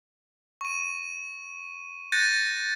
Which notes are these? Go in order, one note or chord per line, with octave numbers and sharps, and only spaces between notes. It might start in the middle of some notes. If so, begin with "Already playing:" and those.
C#6 D#7
F#6 G6 A6 A#6 C#7 D#7